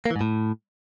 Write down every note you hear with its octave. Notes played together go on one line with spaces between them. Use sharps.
A#3
E3
G#2
A2